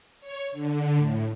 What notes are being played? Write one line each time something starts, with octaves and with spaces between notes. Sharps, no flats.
C#5
D3
A2